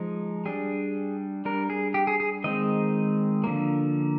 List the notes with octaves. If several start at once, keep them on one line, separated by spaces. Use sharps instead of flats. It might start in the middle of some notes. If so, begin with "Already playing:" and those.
Already playing: F3 G#3 D#4
G3 D4 G#4
G3 D4 A#4
G#4
G4
G#4
G#4
D#3 G#3 C4 D#4 D#5
D3 F3 A#3